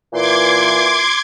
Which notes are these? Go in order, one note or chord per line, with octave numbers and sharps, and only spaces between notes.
A#2 E3 C6 D6 G#6